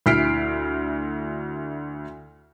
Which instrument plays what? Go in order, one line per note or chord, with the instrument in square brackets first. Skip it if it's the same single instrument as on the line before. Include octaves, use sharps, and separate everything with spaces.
[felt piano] D2 E4 F6 B6 C7 D7